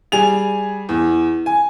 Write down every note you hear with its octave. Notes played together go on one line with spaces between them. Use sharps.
G3 G#4 G#5 F7
E2
G#5